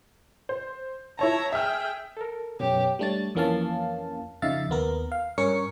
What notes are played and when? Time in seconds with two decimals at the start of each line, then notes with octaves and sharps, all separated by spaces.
0.49 C5
1.19 E4 C#5 E5 A5 A#5
1.53 G#4 E5 G5 F6
2.17 A4 A#4
2.60 F#2 B2 G4 C#5
2.99 G3 A3 D4 C#5 A6
3.35 F2 E3 A#3 C#4 F5 A5
4.42 F2 C#3 D#4 E5 F5 A6
4.70 D#2 B3 A#4
5.12 F5
5.38 G2 C#4 A#4 C#5 C#6 C#7